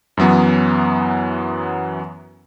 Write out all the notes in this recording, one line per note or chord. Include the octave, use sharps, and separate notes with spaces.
F#2 E3 F#3 B3